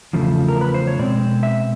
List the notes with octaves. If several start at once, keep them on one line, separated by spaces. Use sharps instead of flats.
E2 C#3 F3 A3
A#4
B4
C5
C#5
B2 G#3 C4 D5
E5